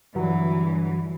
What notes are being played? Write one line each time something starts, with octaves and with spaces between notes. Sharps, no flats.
G2 D3 E3 F#3